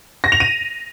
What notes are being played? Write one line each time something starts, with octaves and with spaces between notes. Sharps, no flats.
A#6
F7
D#7